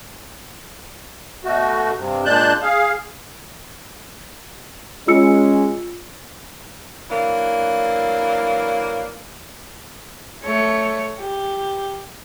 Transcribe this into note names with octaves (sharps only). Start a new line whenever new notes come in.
B2 A3 F#4
G2 C3
A#2 G#3 D4 A5 F#6 G6
G#4 F5
G#3 C#4 F4 E6 C#7
E3 F#3 A#3 D4
A3 C#5
G4